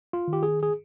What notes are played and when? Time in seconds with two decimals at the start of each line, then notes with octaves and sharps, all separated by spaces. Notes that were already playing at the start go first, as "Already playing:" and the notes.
0.13 F4
0.28 D#3
0.33 G4
0.43 G#4
0.63 G#4